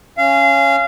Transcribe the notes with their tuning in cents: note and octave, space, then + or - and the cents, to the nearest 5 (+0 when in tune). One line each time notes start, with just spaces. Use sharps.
C#4 +0 F5 -25